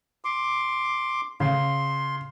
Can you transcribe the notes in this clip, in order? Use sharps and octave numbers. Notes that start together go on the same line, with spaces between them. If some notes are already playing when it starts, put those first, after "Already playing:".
C6 D6
C#3 C6